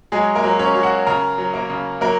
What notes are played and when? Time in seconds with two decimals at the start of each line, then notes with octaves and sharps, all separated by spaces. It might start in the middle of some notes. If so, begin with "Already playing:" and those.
0.12 F#3 G#3 G#4
0.35 A#3 A#4
0.43 F#3
0.59 C#4 C#5
0.75 F#3
0.83 F#4 F#5
1.07 C#3 A#4 A#5
1.38 F#3
1.54 A#3 A#4
1.70 C#3
2.01 F#3 A#3 A#4